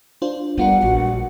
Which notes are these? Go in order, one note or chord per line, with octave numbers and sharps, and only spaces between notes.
D4 F4 C5
G3 A#3 B3 F4 A#4 F#5
A#1 F#4